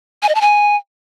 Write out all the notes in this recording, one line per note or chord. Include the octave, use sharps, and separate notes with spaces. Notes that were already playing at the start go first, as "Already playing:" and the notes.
G#5
D#5
A5
G#5